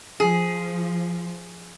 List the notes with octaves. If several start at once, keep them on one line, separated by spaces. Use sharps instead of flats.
F3 G#4